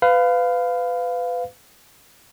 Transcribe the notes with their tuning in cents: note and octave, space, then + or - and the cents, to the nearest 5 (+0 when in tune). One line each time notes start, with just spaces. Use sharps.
B4 +25 F5 +0